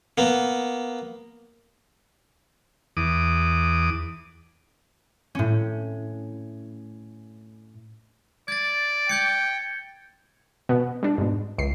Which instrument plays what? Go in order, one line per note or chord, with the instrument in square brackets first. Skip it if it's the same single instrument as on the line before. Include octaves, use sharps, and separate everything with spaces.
[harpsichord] A#3 B3
[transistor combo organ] E2 D6 D#6
[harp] A2 C#4
[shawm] D5 [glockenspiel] G#6 A6
[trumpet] G5 [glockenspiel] G6 G#6 C#7
[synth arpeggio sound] B2 B3
G3 D4
G#2 B2
C#2 C7